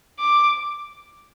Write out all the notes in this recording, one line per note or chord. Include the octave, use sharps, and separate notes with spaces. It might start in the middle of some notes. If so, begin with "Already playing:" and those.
D6